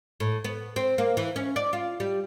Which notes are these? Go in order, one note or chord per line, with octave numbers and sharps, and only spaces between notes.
A2
B3
C4
A#3
E3
C#4
D5
F4
G3